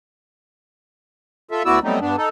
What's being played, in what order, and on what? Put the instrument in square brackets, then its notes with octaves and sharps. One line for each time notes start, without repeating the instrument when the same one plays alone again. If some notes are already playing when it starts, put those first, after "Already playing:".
[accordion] F4 A4 E5
D2 B3 E4 F#4 D5 E6
F#3 G3 A3 B3 C4 D#4
G2 B3 D4
D#4 A4